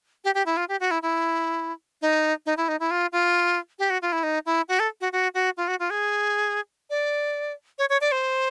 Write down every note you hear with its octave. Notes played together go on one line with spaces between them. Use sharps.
G4
G4
E4
F4
G4
F#4
E4
E4
D#4
D#4
E4
D#4
E4
F4
F4
G4
F#4
F4
E4
D#4
E4
F#4
A4
F#4
F#4
F#4
F4
F#4
F4
G#4
D5
C#5
C#5
D5
C5